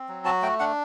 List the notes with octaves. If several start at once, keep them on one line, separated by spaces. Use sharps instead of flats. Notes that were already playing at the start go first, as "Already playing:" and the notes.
Already playing: C4
F#3
F#4 A5
A3 G5
D4 F#5